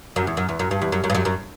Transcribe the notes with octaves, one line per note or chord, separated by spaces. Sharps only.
F#2
E2
F#2
E2
F#2
G2
E2
F#2
F#2
G2
F#2
F#2